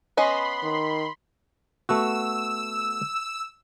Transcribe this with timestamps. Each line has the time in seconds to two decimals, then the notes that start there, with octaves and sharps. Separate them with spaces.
0.17 B3 C#4 D#5 B5 C6
0.63 D#3
1.89 A3 B3 F#4 E6